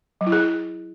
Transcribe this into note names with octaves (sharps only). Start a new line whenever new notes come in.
F#3
E4
G#4